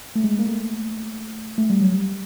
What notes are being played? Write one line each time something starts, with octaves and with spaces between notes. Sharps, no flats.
A3
G#3
A#3
A3
A3
G3
F#3
G3